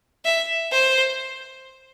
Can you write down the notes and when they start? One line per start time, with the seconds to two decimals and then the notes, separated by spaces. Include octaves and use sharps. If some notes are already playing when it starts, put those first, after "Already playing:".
0.25 E5
0.72 C5